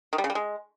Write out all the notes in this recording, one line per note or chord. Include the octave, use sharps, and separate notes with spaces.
D#3
G3
C#3
G3
G#3